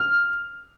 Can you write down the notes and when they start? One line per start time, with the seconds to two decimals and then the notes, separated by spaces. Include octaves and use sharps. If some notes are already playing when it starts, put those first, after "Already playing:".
Already playing: F6